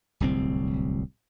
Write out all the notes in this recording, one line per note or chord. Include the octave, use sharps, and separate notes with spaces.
D1 C2 C4